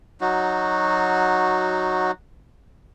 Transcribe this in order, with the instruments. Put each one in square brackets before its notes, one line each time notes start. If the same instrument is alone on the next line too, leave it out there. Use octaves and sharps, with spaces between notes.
[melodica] F#3 D#4 F#4